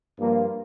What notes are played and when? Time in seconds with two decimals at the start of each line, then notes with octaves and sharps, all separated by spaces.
0.18 G2 F3 A#3 F4